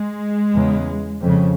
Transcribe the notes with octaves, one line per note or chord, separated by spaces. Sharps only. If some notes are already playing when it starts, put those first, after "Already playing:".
Already playing: G#3
E2 C#3
F2 C#3